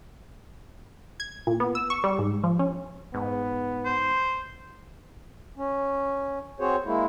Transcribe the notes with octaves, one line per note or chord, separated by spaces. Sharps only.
G#6
A#2
B3
E6
C#6
G3
G#2
F3
C#4
G#2 B3
C5
C#4
C4 F#4 G#4 C5 C#5
G#3 A#3 E4